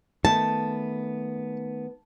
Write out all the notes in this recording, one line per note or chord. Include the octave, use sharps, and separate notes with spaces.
D#3 A3 B3 A5